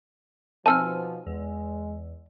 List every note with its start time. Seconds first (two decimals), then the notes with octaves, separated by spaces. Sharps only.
0.66 B2 F3 C4 D#4 G#5 A5 E6 F6
1.27 E2 G#3